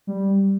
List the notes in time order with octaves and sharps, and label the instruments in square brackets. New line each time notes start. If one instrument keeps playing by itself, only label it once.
[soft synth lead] G3